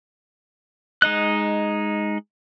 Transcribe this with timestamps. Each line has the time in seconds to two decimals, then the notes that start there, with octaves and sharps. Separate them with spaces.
1.02 G#3 D#4 D#5 F#6